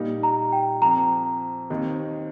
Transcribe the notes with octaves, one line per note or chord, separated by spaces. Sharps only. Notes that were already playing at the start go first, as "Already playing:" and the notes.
Already playing: A#2 G3 A#3 D#4
A#5
G5
F2 F3 C4 A#5
D#2 D#3 C4 D#4